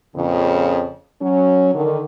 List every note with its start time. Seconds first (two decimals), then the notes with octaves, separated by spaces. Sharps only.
0.15 F2 A#2 C#3
1.20 F#3 C#4
1.73 D3 D#3